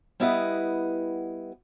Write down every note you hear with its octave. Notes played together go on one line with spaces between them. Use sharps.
G3 B3 E4 B4 D#5 F#5